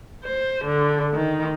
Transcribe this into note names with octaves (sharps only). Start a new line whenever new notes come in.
C5
D3
D#3